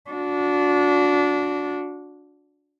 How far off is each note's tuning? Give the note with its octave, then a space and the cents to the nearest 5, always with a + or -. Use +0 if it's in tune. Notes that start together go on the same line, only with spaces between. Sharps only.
D4 -20 F#4 -35